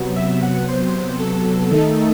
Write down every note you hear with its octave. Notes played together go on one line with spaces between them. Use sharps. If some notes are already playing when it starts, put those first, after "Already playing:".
Already playing: C3 F#3 B3
E5
F#5
C5
A4
D#3 A3 D#4